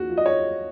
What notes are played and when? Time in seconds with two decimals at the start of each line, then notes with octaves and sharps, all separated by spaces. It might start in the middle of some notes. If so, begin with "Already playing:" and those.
Already playing: D#2 F#4
0.10 F3
0.17 D#5
0.26 C#5